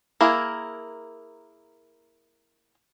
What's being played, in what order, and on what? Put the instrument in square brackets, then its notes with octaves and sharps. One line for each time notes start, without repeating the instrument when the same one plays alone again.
[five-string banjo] A#3 E4 G#4 A#4